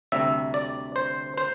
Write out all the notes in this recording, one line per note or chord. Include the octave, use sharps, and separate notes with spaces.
D2 C3 G3 E5
D5
C5
C5